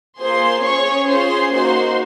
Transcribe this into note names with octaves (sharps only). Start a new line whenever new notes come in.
A#3 F4 G#4 C5 C6
C#4 G#4 C#5 C#6
C#4 F4 G#4 C5 C6
A#3 D#4 F#4 C5 C6